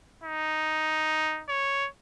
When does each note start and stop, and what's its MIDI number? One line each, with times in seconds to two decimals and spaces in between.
0.24 1.42 63
1.49 1.87 73